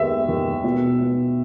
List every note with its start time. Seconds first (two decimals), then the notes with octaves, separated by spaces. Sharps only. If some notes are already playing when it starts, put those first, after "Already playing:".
Already playing: D#2 G#3 B3 E5
0.28 D#2
0.64 B2
1.00 B2